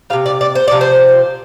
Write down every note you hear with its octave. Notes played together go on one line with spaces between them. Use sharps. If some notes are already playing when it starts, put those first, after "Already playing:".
G3 F5
C3
D5
D5
C5
C3 F3 D5
C5